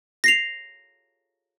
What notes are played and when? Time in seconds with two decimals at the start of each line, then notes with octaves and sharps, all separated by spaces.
0.24 A#6 C7 F7